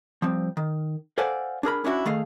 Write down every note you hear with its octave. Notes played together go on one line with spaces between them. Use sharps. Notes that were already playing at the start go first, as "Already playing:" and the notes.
F3 G3 C4
D#3
A4 C5 D5 F5 F#5 G#5
D4 G#4 A#4 B5
C#4 D4 E4 F#4
D#3 A3 G#4 F5